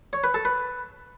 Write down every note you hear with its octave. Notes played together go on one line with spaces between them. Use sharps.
C#5
B4
A4
B4